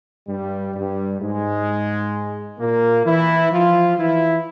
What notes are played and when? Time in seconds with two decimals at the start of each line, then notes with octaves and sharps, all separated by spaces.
0.28 G2 G3
0.74 G2 G3
1.21 G#2 G#3
2.59 A#2 A#3
3.06 E3 E4
3.52 F3 F4
3.98 E3 E4